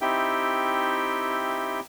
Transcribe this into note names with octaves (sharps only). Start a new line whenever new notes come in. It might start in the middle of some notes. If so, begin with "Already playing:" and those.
C4 D#4 E4 G4 E5 G5